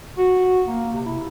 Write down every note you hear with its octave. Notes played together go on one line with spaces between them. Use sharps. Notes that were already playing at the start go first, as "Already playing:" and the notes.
F#4
A#3
C3
E4